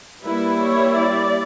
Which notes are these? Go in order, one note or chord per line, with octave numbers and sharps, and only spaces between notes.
G3 A#3 E4 B4
C#5
D5